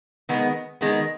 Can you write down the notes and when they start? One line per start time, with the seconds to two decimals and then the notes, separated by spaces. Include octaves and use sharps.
0.29 D#3 G#3 B3
0.81 D#3 G#3 B3